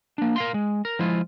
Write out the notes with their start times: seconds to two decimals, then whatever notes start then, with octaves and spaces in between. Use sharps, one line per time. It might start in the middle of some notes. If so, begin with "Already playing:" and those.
0.18 A#3 D4
0.36 A#4 F5 C6
0.54 G#3
0.85 A#4
0.99 F3 G#3 E4 F4